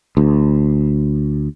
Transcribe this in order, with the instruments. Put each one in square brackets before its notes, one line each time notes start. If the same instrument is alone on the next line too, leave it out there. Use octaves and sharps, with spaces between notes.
[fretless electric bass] D2